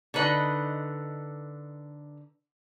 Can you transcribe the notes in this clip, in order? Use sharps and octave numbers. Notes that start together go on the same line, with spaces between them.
D3 D#4 B4 D#5